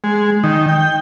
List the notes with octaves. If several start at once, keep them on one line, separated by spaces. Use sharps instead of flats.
G#3
D#3
G5